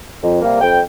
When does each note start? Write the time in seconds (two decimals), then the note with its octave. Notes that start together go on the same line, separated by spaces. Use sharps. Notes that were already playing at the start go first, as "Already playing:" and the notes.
0.23 F2
0.42 C3 G3 A#3
0.61 F2 G5